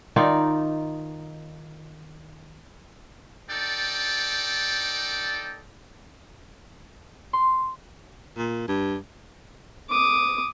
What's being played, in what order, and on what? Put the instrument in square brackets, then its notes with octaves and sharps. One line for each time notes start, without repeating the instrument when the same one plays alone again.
[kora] D#3 D#4 F4 D5
[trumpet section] D#4 A4 D5 G5
[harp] C6
[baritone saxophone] A#2
G2
[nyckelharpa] D6 D#6